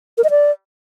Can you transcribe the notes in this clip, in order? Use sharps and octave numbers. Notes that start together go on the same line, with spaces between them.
A#4
D#5
D5